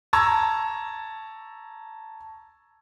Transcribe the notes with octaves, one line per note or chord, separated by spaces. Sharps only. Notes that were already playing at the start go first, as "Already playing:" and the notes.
A5 A#5 C#6 E6 G#6